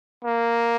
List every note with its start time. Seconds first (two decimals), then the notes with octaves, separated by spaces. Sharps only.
0.25 A#3